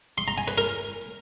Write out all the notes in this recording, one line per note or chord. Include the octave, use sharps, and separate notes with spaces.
C6
A#5
G#5
B4
A#4